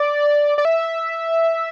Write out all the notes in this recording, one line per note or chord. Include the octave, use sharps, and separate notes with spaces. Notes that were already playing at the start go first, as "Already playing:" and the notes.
Already playing: D5
D5
E5